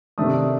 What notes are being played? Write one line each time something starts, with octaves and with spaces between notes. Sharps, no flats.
C3 D#3 A3 D4 D#6